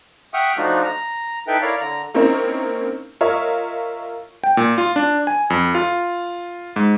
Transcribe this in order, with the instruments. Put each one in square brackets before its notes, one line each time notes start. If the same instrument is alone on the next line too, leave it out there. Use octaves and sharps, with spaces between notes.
[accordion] E5 F#5 G5 C#6 D#6 F6
F3 A3 D4 D#4 F4 F#4
A#5
D#4 E4 A4 B4 E5 G5
E4 A#4 C#5 D5 F5
D3 A#5
[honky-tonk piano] A#3 C4 C#4 D#4 E4 A#4
F4 A#4 C#5 D#5 E5
[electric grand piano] G5
A#2
F4
D4
G#5
F2
F4
G#2